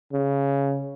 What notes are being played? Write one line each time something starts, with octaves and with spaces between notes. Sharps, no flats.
C#3